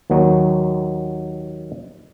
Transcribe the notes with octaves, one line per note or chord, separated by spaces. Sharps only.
D#2 D#3 F#3